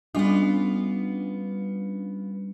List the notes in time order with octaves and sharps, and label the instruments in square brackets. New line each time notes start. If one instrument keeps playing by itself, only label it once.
[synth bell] G3 C#4 D4 [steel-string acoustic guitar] B3 F4